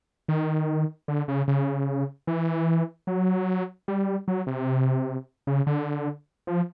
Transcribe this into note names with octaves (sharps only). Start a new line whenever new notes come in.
D#3
D3
C#3
C#3
E3
F#3
G3
F#3
C3
C#3
D3
F3